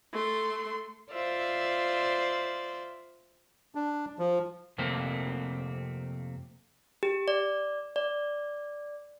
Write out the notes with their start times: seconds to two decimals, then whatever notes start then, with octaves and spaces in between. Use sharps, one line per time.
0.13 A3 C6
1.12 F4 C5 D5 E5
3.75 D4
4.19 F3
4.78 F2 C3 A3 A#3 C4
7.03 G4
7.28 D5
7.96 D5